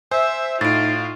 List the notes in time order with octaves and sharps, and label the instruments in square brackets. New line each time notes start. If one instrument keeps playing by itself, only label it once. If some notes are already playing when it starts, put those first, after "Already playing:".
[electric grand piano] C5 [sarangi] E5 [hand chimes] G#5
[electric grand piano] A2 [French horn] D#4 [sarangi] F4 [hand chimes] A6 D7